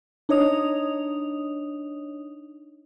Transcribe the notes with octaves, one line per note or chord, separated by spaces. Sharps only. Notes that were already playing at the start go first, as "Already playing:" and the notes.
D4 D#4 C#5 D#5 D#6 F7